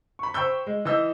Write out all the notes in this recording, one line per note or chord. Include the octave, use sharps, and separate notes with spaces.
B5 C#6
C5 G5 B5 C#6 E6 G6
G#3
E3 D#5 E6 G6